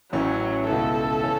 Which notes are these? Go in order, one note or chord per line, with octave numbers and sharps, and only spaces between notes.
A1 A2 E3 F#3 C#4 E4
C#2 B2 B3 E4 A4
C#3 E3 C#4